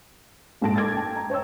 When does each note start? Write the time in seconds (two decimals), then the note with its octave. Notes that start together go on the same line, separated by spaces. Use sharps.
0.61 A#1 G#2 A4 A5 A#6 D7
0.76 D6 G#6 A6
0.94 G5 A5
1.16 A#5
1.30 C5 C#5 G5 E6